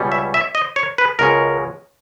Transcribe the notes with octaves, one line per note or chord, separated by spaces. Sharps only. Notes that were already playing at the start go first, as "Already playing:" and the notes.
Already playing: C#2 B2 G3 C#4
E5
E5
D#5
C#5
B4
C#2 B2 G#3 C#4 A#4